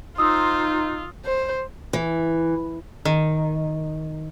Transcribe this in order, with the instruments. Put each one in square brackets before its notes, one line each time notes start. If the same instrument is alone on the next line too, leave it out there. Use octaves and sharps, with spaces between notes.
[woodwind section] D#4 [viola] F4 [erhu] C5 [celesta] D#6 E6
[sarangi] C5
[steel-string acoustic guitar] E3
[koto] D#3